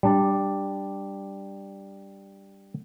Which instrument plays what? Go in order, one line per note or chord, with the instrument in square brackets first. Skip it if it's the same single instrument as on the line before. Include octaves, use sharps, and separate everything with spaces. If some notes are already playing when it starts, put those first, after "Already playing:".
[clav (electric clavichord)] G3 D4 D5